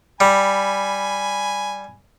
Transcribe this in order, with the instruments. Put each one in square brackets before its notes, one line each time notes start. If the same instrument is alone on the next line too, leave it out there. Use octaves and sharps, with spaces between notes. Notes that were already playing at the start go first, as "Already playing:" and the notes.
[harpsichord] G3 [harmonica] G#5 B5